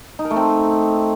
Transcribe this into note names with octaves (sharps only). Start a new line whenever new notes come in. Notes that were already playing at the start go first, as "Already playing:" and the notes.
D#4
A#4
A3
C4